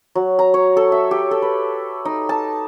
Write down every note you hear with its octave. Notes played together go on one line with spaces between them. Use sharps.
F#3
A#5
C#5
A4
E5
G4
A4
B4
D#4
A5